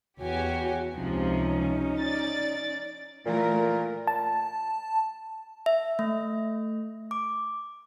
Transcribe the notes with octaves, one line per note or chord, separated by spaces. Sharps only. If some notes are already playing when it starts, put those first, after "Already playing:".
E2 F#4 G4 C#5 G#5
C#2 C3 F3 C#4 D#4
D5 A6
A#2 E3 A3 A#4
A5
E5
A3
D6